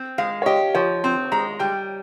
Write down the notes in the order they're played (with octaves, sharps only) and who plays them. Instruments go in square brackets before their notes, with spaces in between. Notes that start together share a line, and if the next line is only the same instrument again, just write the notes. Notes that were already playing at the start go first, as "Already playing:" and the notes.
Already playing: [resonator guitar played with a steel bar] C4
[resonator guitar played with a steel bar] G#3 [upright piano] F5
[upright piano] C#5
[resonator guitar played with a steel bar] G4 [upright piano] D#5
[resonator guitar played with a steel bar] F3 [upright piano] C#5
[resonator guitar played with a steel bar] C4 [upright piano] C6
[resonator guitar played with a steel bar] G#3 [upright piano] A#5
[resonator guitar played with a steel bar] G3 [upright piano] G5